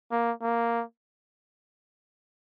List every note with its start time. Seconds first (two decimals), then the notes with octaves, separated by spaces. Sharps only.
0.11 A#3
0.42 A#3